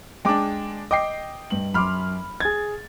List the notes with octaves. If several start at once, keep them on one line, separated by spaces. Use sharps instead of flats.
G#3 D4 G5 D6
D#5 G5 D6 C7
G2 F#7
F#2 B5 C6 D6 F6
G#4 G#6 A6